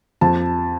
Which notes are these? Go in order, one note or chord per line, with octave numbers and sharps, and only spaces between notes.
F2 A5